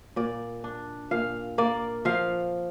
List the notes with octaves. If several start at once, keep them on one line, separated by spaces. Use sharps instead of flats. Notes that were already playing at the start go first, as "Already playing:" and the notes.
A#2 D5
D4
A#2 F5
A#3 D5
F3 F5